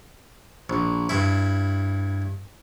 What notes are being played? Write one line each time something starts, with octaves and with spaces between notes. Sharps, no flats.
A#1
G2 E4